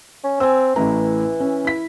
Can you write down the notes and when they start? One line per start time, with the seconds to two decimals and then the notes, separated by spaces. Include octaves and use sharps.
0.24 C#4
0.40 C4 G#5 E6
0.76 A1 A2 E3 A#5
1.40 C#4
1.65 E4 B6